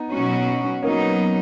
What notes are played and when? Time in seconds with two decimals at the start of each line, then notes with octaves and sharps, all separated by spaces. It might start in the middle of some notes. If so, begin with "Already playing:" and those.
Already playing: B3 D#4
0.13 B2 F#3 C#4 F#4
0.82 F#3 A#3 B3 C#4 D#4